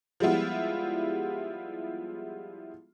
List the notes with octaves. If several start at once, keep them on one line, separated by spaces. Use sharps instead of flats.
F3 G3 G#3 B3 E4 F4